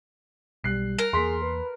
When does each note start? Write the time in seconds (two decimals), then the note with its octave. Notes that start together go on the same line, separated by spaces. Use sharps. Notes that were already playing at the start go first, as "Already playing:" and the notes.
0.64 B1 G3 F#6 C7
0.99 A#4
1.13 E2 A#3 G#4 C6 B6
1.42 B4